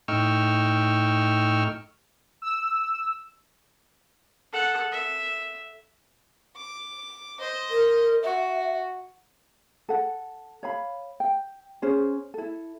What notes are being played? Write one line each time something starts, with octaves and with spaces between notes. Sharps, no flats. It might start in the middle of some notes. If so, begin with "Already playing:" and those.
A2 D#4 G5 C#6 E6 F6
E6
A4 F#5
E5
D6
C5 D#5
A#4
F#4 E5
A4 F#5
C#5 F5 B5
G5
C#4 G#4 C5
E4 A4